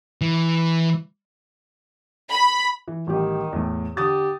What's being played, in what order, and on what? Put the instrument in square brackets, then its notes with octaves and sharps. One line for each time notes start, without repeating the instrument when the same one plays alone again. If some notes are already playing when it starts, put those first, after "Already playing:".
[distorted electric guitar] E3
[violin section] B5
[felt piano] E3
[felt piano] A1 G3 G4 [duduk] D#3
[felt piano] E2 A2
[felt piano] D3 D#6 A6 [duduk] G4